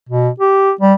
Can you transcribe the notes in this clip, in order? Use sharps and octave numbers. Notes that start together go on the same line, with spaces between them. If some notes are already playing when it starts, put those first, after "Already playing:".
B2
G4
G3